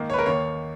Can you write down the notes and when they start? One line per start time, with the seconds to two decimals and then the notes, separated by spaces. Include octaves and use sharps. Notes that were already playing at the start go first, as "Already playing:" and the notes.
Already playing: G#2 D#3 A#3
0.10 C#5
0.14 B4
0.19 A#4
0.26 D#2 D#3 A#3 C#5